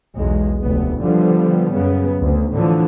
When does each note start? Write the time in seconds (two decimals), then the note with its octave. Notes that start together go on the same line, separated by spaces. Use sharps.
0.16 B1 E2 G#3
0.63 F1 D2 B3
1.00 D3 F3 G3 B3
1.72 F#2 C#3 B3
2.19 D2
2.51 A2 D3 E3 F3